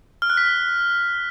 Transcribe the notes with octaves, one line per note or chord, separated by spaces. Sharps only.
F6
F#6
B6